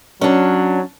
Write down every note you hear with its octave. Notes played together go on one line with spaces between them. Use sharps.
F#3 C#4 D4